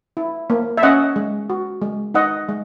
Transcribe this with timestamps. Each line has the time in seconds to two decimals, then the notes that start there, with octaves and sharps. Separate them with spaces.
0.17 E4
0.50 A#3
0.77 E5
0.83 C#4 D#5 F#5
1.16 G#3
1.50 F#4
1.82 G#3
2.14 D#4 D#5 F#5
2.49 G#3